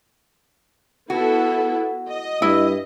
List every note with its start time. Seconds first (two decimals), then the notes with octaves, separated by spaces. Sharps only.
1.10 B3 E4 F#4 A4
2.09 D#5
2.42 G2 E4